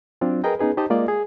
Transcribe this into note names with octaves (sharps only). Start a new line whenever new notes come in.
F#3 C4 D4 F4
G#4 A#4 B4 D#5 G5 A#5
B3 C#4 D#4 G#4 B4
D#4 G4 C5 D#5 A5
G#3 A#3 F4 D5 D#5
G#4